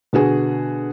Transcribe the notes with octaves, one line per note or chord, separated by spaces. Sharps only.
B2 D3 F#4 G#4